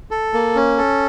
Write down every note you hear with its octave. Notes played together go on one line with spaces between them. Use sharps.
A4
A#3
C#4
A4